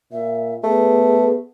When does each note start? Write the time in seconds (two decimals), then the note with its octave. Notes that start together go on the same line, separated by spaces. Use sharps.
0.13 A#2 E5
0.64 A3 B3 G#4